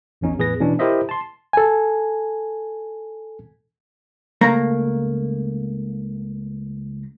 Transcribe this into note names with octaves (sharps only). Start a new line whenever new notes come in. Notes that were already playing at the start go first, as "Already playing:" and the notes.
A1 E2 C#4 D#4
E2 A2 G#4 B4 A#6
B2 E3 C#4 D4
E4 G4 A#4 C5 D#5 E5
A5 C6
A4 G#5
C#2 A3 A#3 A#5